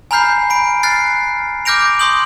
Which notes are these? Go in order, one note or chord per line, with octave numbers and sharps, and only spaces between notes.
G#5 A#5 B5 F6 G6 C7
B5 D7
F6 F#6 A6 C7
D6 F6 G6 A#6 D7 F7
C6 C#6 D#6 G6 F#7